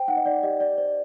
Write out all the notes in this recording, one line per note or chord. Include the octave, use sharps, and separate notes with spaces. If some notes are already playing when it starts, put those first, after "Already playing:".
Already playing: C5 G5
D#4 F#5
D#5
D#4 D5
G4 D#5
G4 D5
C5 D5